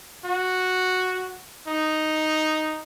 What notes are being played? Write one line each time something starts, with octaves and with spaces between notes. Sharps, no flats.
F#4
D#4